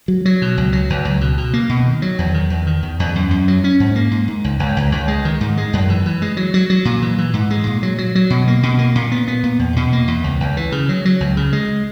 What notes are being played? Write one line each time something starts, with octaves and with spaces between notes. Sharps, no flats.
F#3
F#3
B2
C#2
F#3
C#2
C#2
B2
B2
A#3
B2
D#3
F#3
E2
D#3
E2
D#3
E2
E2
F#2
F#2
F#3
C#4
G#2
A#3
G#2
G#2
C#2
C#2
C#2
C#2
G#3
D#3
G#2
G#3
F#2
E3
E3
G#3
F#3
F#3
F#3
A#2
E3
E3
G#2
G#3
A#2
F#3
F#3
F#3
B2
A#3
B2
A#3
A#2
B3
B3
A#2
E2
B2
A#3
E2
C#2
C#2
E3
C#3
F#3
F#3
C#2
C#3
G#3